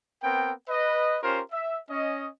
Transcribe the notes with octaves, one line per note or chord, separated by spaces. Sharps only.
B3 C4 A#4 G5
B4 D#5
C#4 F4 G4 A#4 C5
E5
C#4 D#5